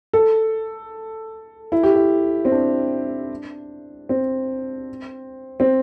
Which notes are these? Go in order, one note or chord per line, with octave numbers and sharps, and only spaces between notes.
A4
E4
G4
E4
C4
D4
C4
C4